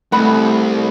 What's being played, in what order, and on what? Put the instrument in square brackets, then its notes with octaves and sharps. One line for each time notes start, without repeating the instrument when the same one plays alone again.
[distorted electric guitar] C2 [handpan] A3 [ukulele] F#5 B5